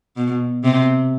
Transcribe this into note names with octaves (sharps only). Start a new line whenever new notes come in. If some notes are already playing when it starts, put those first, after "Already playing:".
B2
C3